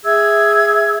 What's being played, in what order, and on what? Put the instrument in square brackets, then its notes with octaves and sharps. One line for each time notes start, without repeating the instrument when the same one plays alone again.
[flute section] G#4 E5 E6 G#6